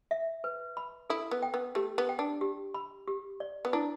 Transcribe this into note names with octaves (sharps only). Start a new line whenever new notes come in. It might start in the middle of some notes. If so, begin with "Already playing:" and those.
E5
B4
B5
E4 A4
B3
G5
B3
A3 G4
B3
G5
D4
G4
B5
G4
D5
B3
D4 E4